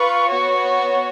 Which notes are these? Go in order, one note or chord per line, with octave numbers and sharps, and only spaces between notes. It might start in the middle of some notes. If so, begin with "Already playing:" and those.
Already playing: F4 B4 F5 C#6
B3 F#4 C#5